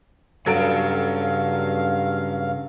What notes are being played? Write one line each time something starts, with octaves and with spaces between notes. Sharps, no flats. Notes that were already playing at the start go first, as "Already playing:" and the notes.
G2 C#3 F#3 A4 F5 D7